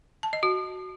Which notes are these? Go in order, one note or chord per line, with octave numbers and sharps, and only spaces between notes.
A5
D#5
F#4